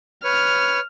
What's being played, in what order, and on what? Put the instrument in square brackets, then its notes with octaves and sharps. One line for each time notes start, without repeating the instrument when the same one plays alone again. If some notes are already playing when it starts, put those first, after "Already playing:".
[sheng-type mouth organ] B4 C#5 [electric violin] F6